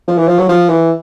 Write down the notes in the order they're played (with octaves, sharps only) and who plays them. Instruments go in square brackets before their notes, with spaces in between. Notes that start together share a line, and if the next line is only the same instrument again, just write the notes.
[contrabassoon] F3
E3
F3
F#3
F3
E3